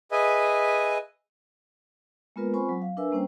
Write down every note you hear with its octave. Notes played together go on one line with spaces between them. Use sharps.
G#4 B4 D#5 E5 G#5
G#3 A#3 B3 F4 A#4 B4
C4 F4 C5 G#5 B5 C#6
F#3
F5
D4 A#4 B4 E5 G#5 E6
G3 A#3 C#4 C5 G5